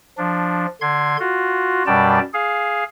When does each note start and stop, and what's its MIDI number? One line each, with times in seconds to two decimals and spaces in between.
0.18 0.66 53
0.18 0.66 62
0.81 1.17 50
0.81 1.17 84
0.81 1.17 92
1.20 1.83 65
1.20 1.83 66
1.86 2.19 42
1.86 2.19 47
1.86 2.19 55
1.86 2.19 74
1.86 2.19 79
1.86 2.19 81
2.34 2.84 68
2.34 2.84 77